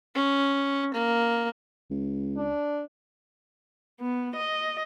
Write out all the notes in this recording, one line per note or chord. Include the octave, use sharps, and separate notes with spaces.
C#4
A#3
C#2
D4
B3
D#5